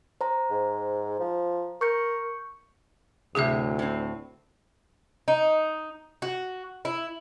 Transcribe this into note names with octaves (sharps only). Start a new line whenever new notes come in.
C5 A#5
G#2
F3
A#4 C#6 G6 C#7
D2 A2 C3 F#3 G#4 E5
A2 C4
D#4
F#4
E4